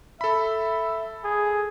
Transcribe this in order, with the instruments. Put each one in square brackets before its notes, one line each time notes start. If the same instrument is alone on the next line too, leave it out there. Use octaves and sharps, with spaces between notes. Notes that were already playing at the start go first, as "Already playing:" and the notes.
[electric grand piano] A4 B5 [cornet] E5
[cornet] G#4